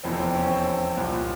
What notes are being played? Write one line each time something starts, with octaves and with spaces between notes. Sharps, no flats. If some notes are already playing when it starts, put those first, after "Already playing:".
F1 E2 E3 C4
C4
C#4
C4
C2 A#2